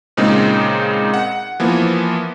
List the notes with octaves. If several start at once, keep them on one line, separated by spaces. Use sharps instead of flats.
A#2 C#3 G#3 C4 D#4
F#5
E3 F3 A#3 B3